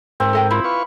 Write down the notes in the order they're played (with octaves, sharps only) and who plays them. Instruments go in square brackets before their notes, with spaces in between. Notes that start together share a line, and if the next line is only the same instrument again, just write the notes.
[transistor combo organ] G#2 A#4 [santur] C4
[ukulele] A4 D#5 G5
[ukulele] E4 F4 [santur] B5
[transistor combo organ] B4 F5 C#6